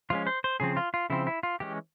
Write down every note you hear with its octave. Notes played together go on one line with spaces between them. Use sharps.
F3 G#3 C#4 F4
C5
C5
C#3 F3 C4 G#4
F4
F4
C#3 F3 C4 E4
E4
F4
E3 G#3 C#4 G4